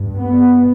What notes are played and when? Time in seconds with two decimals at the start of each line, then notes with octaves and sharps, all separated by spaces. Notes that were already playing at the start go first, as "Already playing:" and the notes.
Already playing: G2
0.16 B3